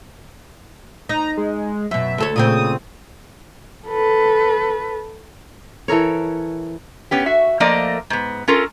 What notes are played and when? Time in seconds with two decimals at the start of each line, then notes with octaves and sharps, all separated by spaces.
1.09 D#4 A#5
1.37 G#3
1.91 F#2 B2 E5
2.18 D2 A4 C#5
2.36 A#2 C#3 C4 D#6
3.87 A4 B4
5.88 E3 A4 A#4 C#5
7.11 B3 C#4 G4
7.26 F#4 E5
7.60 F3 A3 A#3 A#4 D5 D#5
8.10 G#2 B3
8.48 C#4 F4 A4 A#4